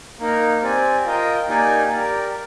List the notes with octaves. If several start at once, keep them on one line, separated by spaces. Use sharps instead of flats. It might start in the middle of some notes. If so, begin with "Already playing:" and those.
A#3 D#4 A#4
C4 G4 D5 G#5
F4 A#4 D#5 G5
A#3 D#4 G4 D5 G#5
G4 A#4 D5